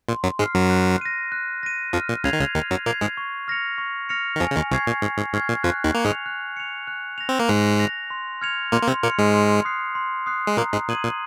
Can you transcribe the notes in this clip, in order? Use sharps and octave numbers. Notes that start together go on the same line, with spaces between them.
A#2 C6
F#2 F#3
G#2 G#3 F6 C7
F#2 F#3
F#6
A#6 D#7
F#6
A#6 D#7
F2 F3 F6
A#2
C#2 C#3 G#6 C7 F7
D#3
C#2 C#3
D#2 D#3 F6
F#2 F#3
A#2 A#3 G#6 C7 F7
G#2 G#3
C#6
F6 A#6 C#7 F7
C#6
F6 A#6 C#7 F7
D#3
F2 F3 G#5
C#3
D#2 D#3
C2 C3 C#6 F6 G#6 C7
A#2
G#2 G#5
G#2
G#2 C#6 F6 G#6 C7
A#2
F2 F3 F#6
D#2 D#3
A#3 C#7 F7
G#2 G#3
F#6
C#7 F7
F#6
A#6 F7
C4
A#3
G#2 G#3 F#6
A#6 F7
C6
F6 G#6 C#7 F7
A#2 A#3 C6
A#3
C3 C4
A#2 A#3 F6 G#6 C#7 F7
G#2 G#3
C6
D#6 F#6 C7
C6
D#6 F#6 C7
G#3
A#2 A#3 A#5
G#2 G#3
A#2 D#6 G#6 D#7 F#7
A#2